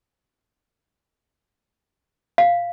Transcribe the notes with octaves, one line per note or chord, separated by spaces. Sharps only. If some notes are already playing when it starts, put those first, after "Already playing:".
F5